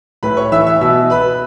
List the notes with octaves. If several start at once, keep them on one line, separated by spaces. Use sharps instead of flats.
A2 B4 B5
C#5 C#6
E3 E5 E6
E5 E6
B2 E5 E6
B4 B5